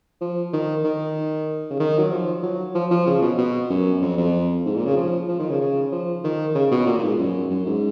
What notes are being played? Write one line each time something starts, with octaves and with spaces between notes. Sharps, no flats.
F3
D#3
D#3
C#3
D#3
F#3
F3
F#3
F3
F3
C#3
B2
B2
F#2
F2
F2
G#2
A#2
C#3
F3
F3
D#3
C#3
C#3
F3
D#3
C#3
B2
A#2
A#2
G#2
F#2
F#2
G#2